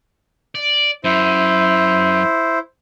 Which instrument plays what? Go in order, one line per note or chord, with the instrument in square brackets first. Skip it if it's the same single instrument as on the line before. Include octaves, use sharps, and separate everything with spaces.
[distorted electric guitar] D5
[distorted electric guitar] F#2 [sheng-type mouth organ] E4 C5